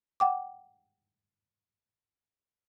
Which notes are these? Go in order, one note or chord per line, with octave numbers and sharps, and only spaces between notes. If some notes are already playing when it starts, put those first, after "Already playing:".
F#5 G5 D6